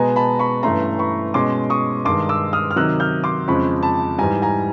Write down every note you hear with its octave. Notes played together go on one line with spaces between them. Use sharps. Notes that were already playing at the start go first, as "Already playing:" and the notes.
Already playing: B2 G#3 B3 G#5 A#5
A5 B5
B5 C#6
G2 E3 A3 C#4 A#5 C6
B5 C#6
B2 G#3 C#4 C6 D6
C#6 D#6
G2 D#3 G#3 C6 D6
D6 E6
D#6 F6
F6
C3 D#3 F#3 E6 F#6
F6 G6
C6 D6
F2 C#3 F3 G#3 B5 C#6
A5 B5
G#2 E3 G3 G#5 A#5
G#5 A#5